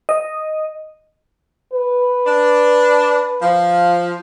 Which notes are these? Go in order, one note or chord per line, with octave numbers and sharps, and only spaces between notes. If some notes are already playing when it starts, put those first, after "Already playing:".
D#5
B4
D4
F3